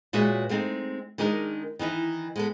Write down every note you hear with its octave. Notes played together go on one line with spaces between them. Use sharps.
A#2 G#3 F#4 B4 C#5 E5
G#3 A3 C4 C#4 D#4
D#3 G#3 D4 D#4 A4 A#4
D#3 E3 D#4 E4
G#3 B3 A4